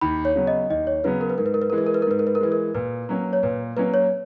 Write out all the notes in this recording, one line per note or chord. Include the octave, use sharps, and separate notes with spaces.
D#2 B5
C#5
C#3 F#3 B3
D#5
D#2 D#5
C#5
C#3 F#3 B3 B4
A#4
B4
G#2 A#4
B4
A#4
B4
E3 G#3 A#4
B4
A#4
B4
A#4
G#2 B4
A#4
B4
A#4
E3 G#3 B4
A#4
A#2 B4
F#3 A#3 C#4
C#5
A#2 B4
F#3 A#3 C#4 B4
C#5